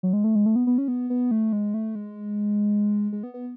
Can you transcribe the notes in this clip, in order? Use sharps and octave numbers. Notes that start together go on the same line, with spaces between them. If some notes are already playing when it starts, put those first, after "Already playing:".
F#3
G#3
A3
G#3
A3
B3
B3
C#4
B3
B3
A3
G#3
A3
G#3
G#3
B3
B3